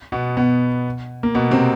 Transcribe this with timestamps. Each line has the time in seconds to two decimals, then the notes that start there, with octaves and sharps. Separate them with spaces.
0.12 B2 B3
0.37 B2 B3
1.23 A#3
1.35 B2 B3
1.51 C3 C4